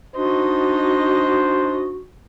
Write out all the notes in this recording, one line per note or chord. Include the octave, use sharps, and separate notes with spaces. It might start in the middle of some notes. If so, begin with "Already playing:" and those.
D4 D#4 F#4 C5 D#5